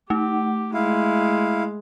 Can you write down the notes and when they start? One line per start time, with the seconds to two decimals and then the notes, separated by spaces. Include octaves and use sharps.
0.10 A3 G4
0.74 G#3 E4 F5